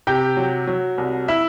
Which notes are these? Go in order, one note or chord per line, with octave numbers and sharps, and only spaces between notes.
C3 G4 G5
F#3
F#3
C2
E4 E5